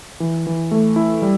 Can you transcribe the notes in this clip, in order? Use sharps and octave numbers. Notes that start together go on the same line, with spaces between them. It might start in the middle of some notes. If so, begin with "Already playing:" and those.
E3
E3
A3
E4
G3